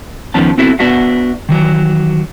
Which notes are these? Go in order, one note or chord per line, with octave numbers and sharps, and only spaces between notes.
E2 D#3 F3 B3 C#4 A5
B3 C4 E4 F#4 A4 E5
B3 D4 F#4 E5 F#5
D#3 E3 F#3